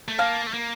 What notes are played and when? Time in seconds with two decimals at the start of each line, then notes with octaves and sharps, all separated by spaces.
0.08 A3
0.18 A#3 F5 A5
0.47 A3
0.54 A#3